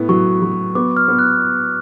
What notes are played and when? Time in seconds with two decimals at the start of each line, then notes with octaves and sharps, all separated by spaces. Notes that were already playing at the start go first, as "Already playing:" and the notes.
Already playing: A2 B3
0.09 F#3 C#6
0.42 F#3
0.75 B3 D6
0.97 F6
1.08 B3
1.19 F#6